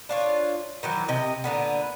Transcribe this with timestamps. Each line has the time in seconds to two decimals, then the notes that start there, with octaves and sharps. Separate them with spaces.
0.09 D4 F4 C#5
0.83 D#3 E3 F#3
1.08 C3 D#5
1.44 A#2 D3 B3